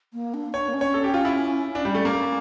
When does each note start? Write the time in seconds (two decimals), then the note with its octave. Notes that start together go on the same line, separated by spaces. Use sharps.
0.13 A#3
0.34 D4
0.53 D4 C#5
0.68 A#3
0.74 C#4
0.81 C#5
0.94 A4
1.04 G4
1.14 F4
1.25 E4
1.75 C#4 D4
1.85 G3
1.95 A3
2.05 A#3